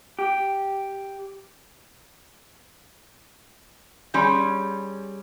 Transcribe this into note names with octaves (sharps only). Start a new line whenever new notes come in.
G4
G3 C#4 G#4 D5 C6 G6